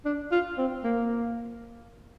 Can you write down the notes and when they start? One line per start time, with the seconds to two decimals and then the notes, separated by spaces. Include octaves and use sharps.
0.05 D4
0.32 F4
0.58 C4
0.84 A#3